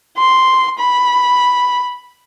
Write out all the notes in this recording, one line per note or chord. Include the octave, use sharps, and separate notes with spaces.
C6
B5